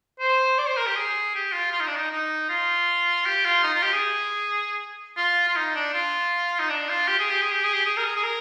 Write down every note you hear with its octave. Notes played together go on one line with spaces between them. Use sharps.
C5
D5
C5
A#4
G4
G#4
G4
F4
F4
D#4
D4
D#4
D#4
F4
G4
F4
D#4
F4
G4
G#4
F4
F4
D#4
D4
F4
D#4
D4
F4
G4
G#4
G4
G#4
G4
G#4
G4
G#4
A#4
G#4
G#4
A#4